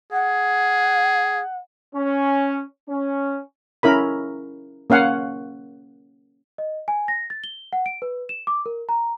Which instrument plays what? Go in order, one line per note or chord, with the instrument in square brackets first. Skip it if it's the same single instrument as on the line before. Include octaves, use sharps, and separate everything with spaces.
[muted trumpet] G#4 [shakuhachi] F#5
[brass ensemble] C#4
C#4
[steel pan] C#4 E4 A#4 B5
A#3 C#4 F5 F#5 G#5
[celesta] D#5
G#5
A#6
A6
G7
F#5
D7
B4
E7
D6
A#4
A#5